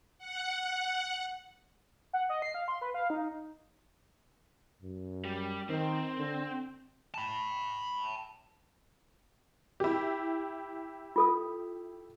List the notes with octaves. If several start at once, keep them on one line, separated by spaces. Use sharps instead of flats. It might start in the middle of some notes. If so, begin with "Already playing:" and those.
F#5
F#5
D#5
C7
F5
C6
B4
F5
D#4
F#2
G3
D#3 C4
D3
A5 B5
E4 G4
F4 A4 D#6